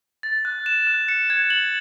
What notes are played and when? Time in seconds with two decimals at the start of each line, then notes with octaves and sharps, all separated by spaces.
0.23 A6
0.45 F#6
0.66 E7
0.87 F#6
1.08 C#7
1.30 G#6
1.50 F#7